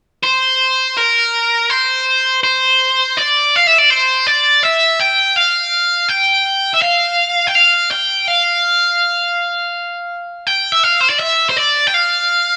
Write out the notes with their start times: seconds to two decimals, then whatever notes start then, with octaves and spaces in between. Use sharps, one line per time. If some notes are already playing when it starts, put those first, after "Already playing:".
0.24 C5
0.97 A#4
1.70 C5
2.44 C5
3.17 D5
3.56 F5
3.67 E5
3.78 D5
3.90 C5
4.27 D5
4.63 E5
5.00 G5
5.36 F5
6.09 G5
6.74 E5
6.82 F5
7.47 G5
7.55 F5
7.91 G5
8.28 F5
10.47 G5
10.72 E5
10.84 F5
11.01 C5
11.10 D5
11.20 E5
11.49 C5
11.57 D5
11.87 G5
11.94 F5